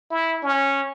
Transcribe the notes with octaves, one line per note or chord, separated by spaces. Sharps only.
E4
C#4